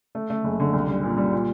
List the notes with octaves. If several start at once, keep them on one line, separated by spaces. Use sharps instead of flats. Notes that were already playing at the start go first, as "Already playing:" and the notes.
A3
A3
F#1
D3
C2
G3
A#2
G3
A#2